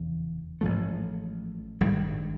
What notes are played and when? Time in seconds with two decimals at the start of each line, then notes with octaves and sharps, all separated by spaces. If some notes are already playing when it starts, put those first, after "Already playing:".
Already playing: F1 E2 C#3 E3
0.61 A1 G#2 F3 A3
1.81 G#1 G2 D#3 G3